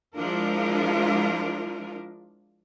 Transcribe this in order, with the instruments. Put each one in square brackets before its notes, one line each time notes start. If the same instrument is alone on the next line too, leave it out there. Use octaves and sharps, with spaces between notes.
[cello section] F3 G#3 D4 E4 F4 A#4